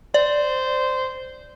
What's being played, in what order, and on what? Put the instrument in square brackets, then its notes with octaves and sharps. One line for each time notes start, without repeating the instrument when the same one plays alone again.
[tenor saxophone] C5 [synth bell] D5